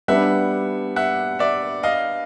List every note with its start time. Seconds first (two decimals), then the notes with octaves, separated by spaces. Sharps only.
0.08 G3 B3 D4 E5 F#5
0.96 E5 F#5
1.39 D5 E5
1.83 D#5 F5